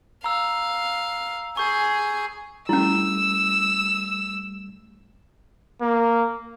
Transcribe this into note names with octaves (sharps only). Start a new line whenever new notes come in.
F5 A#5 E6
G#4 C#6 G6
G3 A3 C#4 E4 E6
A#3